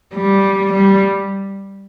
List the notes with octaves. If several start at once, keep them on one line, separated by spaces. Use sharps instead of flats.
G3
G3